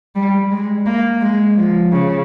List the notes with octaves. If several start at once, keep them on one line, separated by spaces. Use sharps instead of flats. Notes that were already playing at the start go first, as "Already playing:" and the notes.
G3
G#3
A#3
G#3
F3
C#3